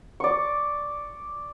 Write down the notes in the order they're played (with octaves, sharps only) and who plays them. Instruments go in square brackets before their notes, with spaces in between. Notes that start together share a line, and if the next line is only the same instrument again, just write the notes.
[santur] D5 C#6